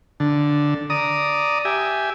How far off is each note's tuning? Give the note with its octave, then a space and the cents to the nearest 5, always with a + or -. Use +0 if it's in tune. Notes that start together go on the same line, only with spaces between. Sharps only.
D3 +0 A5 +0
D5 +0 A#5 +0 D#6 +0
G4 -10 E5 +0 G#5 +5